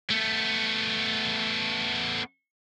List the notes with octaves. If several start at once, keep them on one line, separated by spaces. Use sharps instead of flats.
A3 B3